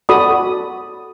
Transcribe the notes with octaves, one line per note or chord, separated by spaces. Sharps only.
F#4 A4 D5 B5 D#6